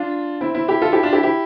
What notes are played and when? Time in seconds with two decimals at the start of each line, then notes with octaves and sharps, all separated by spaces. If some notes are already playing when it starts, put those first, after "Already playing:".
Already playing: D4 F4
0.41 C4 E4
0.55 C4 E4
0.68 E4 G4
0.82 F4 A4
0.92 E4 G4
1.03 D4 F4
1.13 E4 G4
1.23 E4 G4